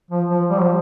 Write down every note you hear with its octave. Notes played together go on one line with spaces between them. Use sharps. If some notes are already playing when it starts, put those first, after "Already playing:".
F3
F3
G3
F3